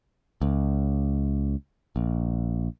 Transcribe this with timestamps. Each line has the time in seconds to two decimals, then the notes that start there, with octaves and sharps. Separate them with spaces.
0.42 C#2
1.96 A#1